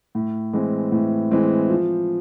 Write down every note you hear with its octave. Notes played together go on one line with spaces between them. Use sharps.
A2
E3 G#3 C4
A2
E3 G#3 C4
F3